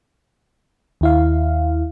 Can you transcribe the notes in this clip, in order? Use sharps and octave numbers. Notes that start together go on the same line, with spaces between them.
D#2 E4 F5